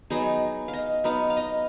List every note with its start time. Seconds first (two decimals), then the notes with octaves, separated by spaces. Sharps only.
0.10 F#3 B3 D#4 G#4
0.68 F5
0.73 D#5
1.04 F#3 B3 D#4 F5
1.30 F5
1.37 D#5